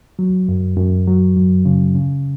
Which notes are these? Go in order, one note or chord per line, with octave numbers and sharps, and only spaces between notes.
F#3
F#2
F#2
F#3
F#2
C#3
C#3